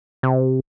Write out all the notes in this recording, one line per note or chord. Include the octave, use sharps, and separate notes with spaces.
C3